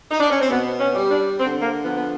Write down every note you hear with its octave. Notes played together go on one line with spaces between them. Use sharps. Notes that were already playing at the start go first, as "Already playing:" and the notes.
D#4
D4
C#4
C4
B2 B3
C#4
G3
D4
D3 C4
A#3
F3 B3
B3